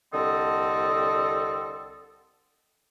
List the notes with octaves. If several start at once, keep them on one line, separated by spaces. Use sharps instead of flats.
C2 D3 C4 A4 D#5